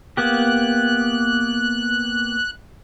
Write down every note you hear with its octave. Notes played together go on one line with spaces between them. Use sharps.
A#3 B3 G4 F#6